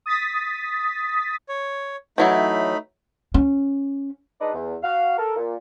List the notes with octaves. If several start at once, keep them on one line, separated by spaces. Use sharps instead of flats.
D#6 A6 B6
C#5
E3 F#3 A3 D#4 E4 B5
C#4
G#3 D4 D#4 B4 D5 D#5
E2
F#4 F5
A4 A#4
A#2